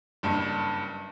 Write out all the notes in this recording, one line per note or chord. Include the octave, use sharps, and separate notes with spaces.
F#1 G2